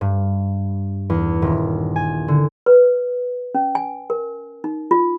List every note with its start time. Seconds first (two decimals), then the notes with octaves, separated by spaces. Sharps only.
0.01 G2
1.10 E2
1.42 D#1
1.96 G#5
2.28 D3
2.66 B4
3.55 C#4
3.75 G#5
4.10 A#4
4.64 D#4
4.91 F4